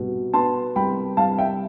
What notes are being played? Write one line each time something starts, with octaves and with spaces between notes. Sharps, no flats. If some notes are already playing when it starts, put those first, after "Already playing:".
Already playing: C2 B2
B3 A5 C6
C2 G5 B5
C2 F5 A5
E5 G5